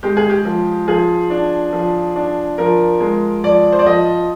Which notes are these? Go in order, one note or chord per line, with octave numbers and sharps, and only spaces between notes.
G#3 G4
G#4
G4
F3
F3 G#4
D4
F3
D4
F3 A#4
G#3
F3 D5
C5
D5
F3 D#5